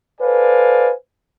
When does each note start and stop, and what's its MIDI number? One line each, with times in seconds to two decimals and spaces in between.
0.21 0.92 69
0.21 0.92 71
0.21 0.92 72
0.21 0.92 74
0.21 0.92 77
0.21 0.92 80